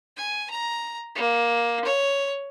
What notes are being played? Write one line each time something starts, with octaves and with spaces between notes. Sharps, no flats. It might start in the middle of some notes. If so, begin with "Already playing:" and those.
G#5
A#5
A#3
C#5